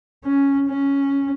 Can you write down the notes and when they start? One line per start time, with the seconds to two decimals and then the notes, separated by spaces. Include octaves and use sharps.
0.25 C#4
0.68 C#4